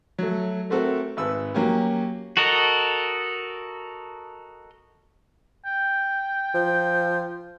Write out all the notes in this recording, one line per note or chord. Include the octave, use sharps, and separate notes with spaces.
F#3 A3
A3 C4 F#4 A4 A#4
G#1 B4 E6
F#3 A#3 C#4 G4
F#4 A4 A#4 D#5
G5
F3